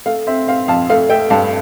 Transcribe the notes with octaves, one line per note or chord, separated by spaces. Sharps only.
A3 F5
C4 E5
C4 F5
F2 F5 A5
A3 F5
A3 E5 G5
G2 F5 A5